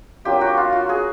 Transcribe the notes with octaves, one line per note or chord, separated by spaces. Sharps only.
F#3 A#3 D4 F4 G4
F#4
F4
F#4
G#4